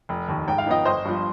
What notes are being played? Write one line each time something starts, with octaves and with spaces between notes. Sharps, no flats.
F1
D#2 D#3
G#2 G5
F5
F3 B3 D#4 D#5 G5
G1 C5 D#5
G2 F3